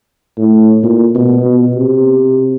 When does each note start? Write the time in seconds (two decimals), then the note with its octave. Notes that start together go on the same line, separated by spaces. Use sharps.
0.38 A2
0.83 A#2
1.15 B2
1.45 B2
1.76 C3